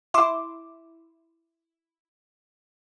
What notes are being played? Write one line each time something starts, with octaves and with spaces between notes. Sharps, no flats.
E4 E5 C6 D6